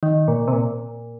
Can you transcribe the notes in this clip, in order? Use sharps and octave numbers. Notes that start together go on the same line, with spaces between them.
D#3
A#2
C3
A#2